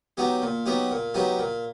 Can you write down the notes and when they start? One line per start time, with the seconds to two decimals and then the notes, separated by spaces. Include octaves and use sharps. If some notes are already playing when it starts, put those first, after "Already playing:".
0.17 F#3 B3 D#4 G4
0.42 A#2
0.66 F#3 B3 D#4 G4
0.91 A#2
1.14 F#3 B3 D#4 G4
1.39 A#2